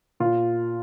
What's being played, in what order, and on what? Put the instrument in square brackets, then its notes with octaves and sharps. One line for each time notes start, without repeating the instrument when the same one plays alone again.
[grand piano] A#2 F4